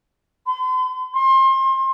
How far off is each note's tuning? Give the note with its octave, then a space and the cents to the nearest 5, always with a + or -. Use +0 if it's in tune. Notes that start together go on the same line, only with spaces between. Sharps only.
C6 -45
C6 +30